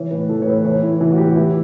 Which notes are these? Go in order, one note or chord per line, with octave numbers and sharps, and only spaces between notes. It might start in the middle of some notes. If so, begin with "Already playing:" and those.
Already playing: E3 C#5
A2 B4
E3 A4
C#5
A2 B4
E3 C#5
A2 E4
E3 F#4
F#4
A2 G4
E3 E4